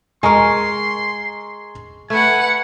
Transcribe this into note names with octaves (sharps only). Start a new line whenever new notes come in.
G#3 A#4 G#5 A#5 C6 C#6
A3 B4 F#5 G#5